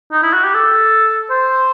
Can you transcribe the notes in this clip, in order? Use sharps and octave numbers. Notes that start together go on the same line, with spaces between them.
D#4
E4
F#4
G4
A4
C5